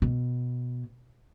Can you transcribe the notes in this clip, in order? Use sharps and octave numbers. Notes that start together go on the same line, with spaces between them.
B2